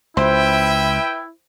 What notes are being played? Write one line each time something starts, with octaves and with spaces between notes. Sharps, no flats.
C#2 E4 B4 C5 E5 G5